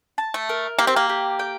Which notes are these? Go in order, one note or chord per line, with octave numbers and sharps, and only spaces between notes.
A5
A3
A#4
A#3 G4
C4
A#3
G4
G5